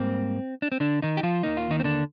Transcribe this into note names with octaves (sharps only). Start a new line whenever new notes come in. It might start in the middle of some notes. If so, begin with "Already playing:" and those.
Already playing: G#2 G3 A#3 C4
D4
C4
D3 D4
D#3 D#4
G4
F3 F4
D#2 D#3 A#3 D#4
F4
D#3 D#4
C4
D3 D4